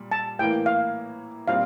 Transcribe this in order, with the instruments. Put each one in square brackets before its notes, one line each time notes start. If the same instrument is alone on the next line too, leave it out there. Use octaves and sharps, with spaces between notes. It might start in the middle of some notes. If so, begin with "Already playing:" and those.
Already playing: [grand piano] A#2 G3
[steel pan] A5
[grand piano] A2 E3 A#3 [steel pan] G5
[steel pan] F5
[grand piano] A#2 G3 C4 [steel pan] F5